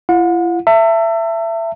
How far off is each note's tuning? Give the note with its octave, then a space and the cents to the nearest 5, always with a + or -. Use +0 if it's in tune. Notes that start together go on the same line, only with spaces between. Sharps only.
E4 +45 F#5 -40
E5 +20 A5 +40